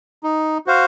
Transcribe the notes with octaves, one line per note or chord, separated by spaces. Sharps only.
D#4
F#4 C5 F5